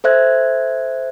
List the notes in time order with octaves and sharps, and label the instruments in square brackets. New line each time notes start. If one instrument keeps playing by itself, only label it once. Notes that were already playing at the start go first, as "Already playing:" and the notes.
[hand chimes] A4 C5 E5 F#6 G#6